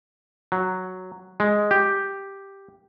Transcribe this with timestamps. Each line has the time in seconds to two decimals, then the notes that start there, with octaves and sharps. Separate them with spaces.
0.52 F#3
1.40 G#3
1.71 G4